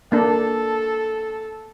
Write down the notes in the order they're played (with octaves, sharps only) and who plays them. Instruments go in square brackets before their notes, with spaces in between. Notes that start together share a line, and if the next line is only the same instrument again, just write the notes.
[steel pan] A#3 D4 [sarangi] A4